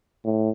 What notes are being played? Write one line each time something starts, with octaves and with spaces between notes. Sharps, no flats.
A2